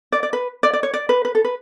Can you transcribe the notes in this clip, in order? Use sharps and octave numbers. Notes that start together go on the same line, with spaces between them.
D5
D5
B4
D5
D5
C#5
D5
B4
B4
A4
B4